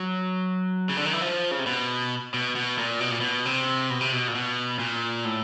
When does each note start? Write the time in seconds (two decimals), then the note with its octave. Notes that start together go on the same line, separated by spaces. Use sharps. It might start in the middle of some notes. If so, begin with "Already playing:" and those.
Already playing: F#3
0.89 C#3
0.97 D3
1.06 D#3
1.13 E3
1.21 F3
1.51 C#3
1.59 C3
1.66 B2
2.34 B2
2.56 B2
2.78 A#2
3.00 B2
3.11 A#2
3.21 B2
3.45 C3
3.90 B2
4.01 C3
4.12 B2
4.28 A#2
4.35 B2
4.79 A#2
5.25 A2